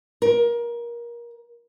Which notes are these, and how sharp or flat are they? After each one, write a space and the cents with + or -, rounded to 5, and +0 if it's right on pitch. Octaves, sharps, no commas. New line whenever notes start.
A#4 +25